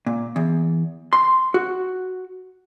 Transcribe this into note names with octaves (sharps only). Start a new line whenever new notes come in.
A#2
E2
C6
F#4